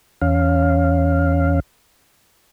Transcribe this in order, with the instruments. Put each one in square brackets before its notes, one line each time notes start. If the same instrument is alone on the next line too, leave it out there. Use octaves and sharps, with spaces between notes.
[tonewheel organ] E2 C#4 F5